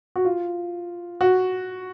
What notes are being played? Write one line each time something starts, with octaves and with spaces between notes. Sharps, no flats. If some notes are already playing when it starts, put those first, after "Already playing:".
F#4
F4
F#4